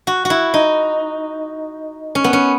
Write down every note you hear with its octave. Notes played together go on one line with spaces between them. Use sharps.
F#4
F#4
E4
D#4
C#4
B3
C#4